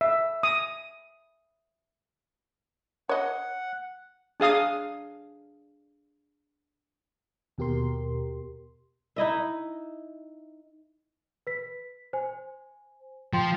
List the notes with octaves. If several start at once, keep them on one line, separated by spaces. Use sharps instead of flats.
E5
D#6
C#5 D#5 F#5
D4 G#4 F5 D#6
D#2 B2 G4 A#4 C6
D#4 E4 D#5 E5
B4 B6
C5 G#5
F3 G5 C6